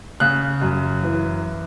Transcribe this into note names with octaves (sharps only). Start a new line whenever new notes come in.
C#3 F#6
F#2
E3